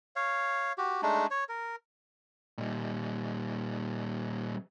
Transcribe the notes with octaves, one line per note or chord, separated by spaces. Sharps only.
C#5 F5
F#4 G4
G#3 A3 D4 D#4
C#5
A#4
A#2 G3